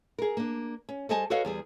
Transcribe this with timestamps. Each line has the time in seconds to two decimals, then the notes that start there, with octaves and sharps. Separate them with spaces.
0.19 G#4 A#4
0.37 A#3 D4
0.89 C#4
1.09 G3 A4 C5 D#5 G#5 A5
1.30 F#4 A4 B4 C#5 D#5 F5
1.45 E2 G3 G#4